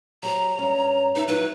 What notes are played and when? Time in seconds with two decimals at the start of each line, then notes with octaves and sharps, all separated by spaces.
0.23 F#3 G4 C5 A#5
0.59 G2 C#4
1.16 D#4 B4 E5
1.28 F#3 E4 B4 C#5